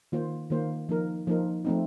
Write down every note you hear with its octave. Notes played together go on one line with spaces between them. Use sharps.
D#3 A#3 F4 C5
D#3 A#3 F4 C5
F3 A#3 D#4 A#4
F3 A#3 D#4 A#4
F3 A3 C4 D#4